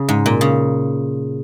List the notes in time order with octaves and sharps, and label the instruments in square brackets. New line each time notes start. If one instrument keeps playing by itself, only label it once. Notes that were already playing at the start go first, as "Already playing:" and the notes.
Already playing: [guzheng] C#3
G#2
A#2
C#3